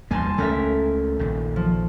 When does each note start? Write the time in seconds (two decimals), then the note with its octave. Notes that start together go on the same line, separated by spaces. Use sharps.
0.11 E2 G3 A#3 G#5 A5 C6
0.38 C#2 A3 C#4 A4 A#4 E5
1.19 A#1 D#2
1.56 F3